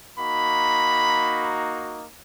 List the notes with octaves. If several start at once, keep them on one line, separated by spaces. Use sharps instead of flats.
A#3 D#4 F#4 B5